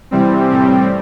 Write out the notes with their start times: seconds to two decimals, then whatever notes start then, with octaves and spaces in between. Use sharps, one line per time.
0.11 C3 E3 G3 C4
0.48 A2 G3 C4